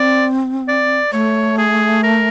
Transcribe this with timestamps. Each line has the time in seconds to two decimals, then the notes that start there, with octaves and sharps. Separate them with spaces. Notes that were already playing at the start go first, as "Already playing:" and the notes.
Already playing: C4 D5
0.68 D5
1.13 A3 C#5
1.58 G#4
2.03 A#4